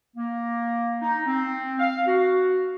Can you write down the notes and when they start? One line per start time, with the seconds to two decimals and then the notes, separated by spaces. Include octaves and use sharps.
0.15 A#3
1.02 D#4
1.26 C4
1.79 F5
2.06 F#4